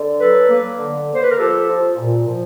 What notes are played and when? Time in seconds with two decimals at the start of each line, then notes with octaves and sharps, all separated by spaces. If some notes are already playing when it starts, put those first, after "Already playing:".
Already playing: D3
0.19 F#3 A4 B4
0.50 A#3
0.79 D3
1.09 A#3
1.14 C5
1.23 B4
1.30 A#4
1.38 F3 G4 A4
1.68 F3
1.97 A#2
2.28 F3